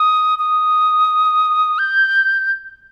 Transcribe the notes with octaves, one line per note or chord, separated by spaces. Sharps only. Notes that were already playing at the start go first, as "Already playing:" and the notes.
Already playing: D#6
D#6
G6